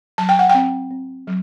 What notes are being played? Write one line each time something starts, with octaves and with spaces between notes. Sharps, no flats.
F#3 A5
G5
F#5
C4 G5
C4
F#3